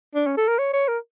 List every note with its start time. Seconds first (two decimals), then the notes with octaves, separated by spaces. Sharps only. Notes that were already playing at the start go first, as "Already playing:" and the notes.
0.15 D4
0.27 C#4
0.37 A4
0.48 A#4
0.59 C#5
0.73 C#5
0.88 A#4